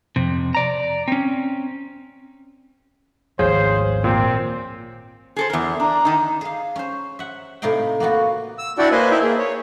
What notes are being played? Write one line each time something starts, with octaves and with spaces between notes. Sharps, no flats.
F2 C3
D5 A#5
C4 C#4
G#1 D2 F3 G#4 C5 C#5 F5 G6
A#2 C4
G#4 A4 C5
E2 A#4
D4 A#5
D#3 D#4
G#4 F5
C#4 C5
E5 F#5
A2 C3 D#4 F5 G5
A#3 B3 F4 F#4
E6
D4 E4 F#4 D5 F#5 G5
A#3 B4 C5 D#5 G#5
D#4 E4 E5 G5
A#3 G#4
C#5